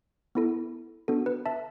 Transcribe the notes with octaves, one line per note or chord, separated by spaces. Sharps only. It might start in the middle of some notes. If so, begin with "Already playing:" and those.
B3 E4 A4
B3 D4 F#4 A4
B4
E5 A5